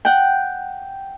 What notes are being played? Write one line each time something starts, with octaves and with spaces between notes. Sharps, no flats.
F#5 G5